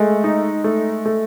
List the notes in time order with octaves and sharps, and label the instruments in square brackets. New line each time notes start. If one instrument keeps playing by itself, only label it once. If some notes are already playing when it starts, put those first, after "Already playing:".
Already playing: [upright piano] G#3 [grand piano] A3
[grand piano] D#4
A3
A3